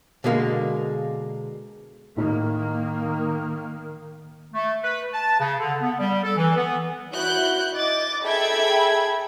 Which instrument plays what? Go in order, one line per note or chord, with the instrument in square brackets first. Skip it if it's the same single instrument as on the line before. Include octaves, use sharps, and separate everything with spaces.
[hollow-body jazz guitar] B2 D3 G#3 A#3
[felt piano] A2 D#4 [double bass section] D#3 A#3
[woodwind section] A3
B4
A5
C#3
D3
B3
G3
A4
E3
B3
[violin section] E4 F#4 F#6 G6
D#5 D6 A6
G#4 A4 E5 G5 B5 G#6